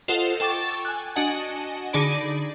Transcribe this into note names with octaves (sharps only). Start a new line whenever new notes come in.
F4 A4 C5 D#5 F#5
A4 G5 C#6 D6 A6
G#5 F#6
D4 F#4 D#5 F#5 G#5 A5
D3 D#4 G#4 D5 B5 D7